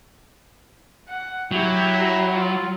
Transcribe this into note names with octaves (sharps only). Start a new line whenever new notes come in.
F#5
F#3 E4 G4
A#5
F4